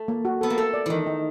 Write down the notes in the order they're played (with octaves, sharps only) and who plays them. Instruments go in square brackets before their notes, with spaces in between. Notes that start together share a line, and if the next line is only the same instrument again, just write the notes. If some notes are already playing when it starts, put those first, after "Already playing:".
Already playing: [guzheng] A3
[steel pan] A#3
F#4
[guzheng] B3 [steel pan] A4
[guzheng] A#3
[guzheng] A3 [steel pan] A4
[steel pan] D5
[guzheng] D#3 E3 [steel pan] D#4
[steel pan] D#4